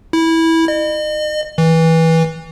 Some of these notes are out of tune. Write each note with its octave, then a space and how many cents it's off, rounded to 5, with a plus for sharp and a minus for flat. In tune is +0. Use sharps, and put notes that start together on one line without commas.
E4 -15
D#5 -40
E3 -20